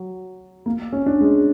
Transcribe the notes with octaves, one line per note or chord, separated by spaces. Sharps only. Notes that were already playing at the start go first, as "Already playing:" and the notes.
Already playing: F#3
A#3
C#4
D4
G#3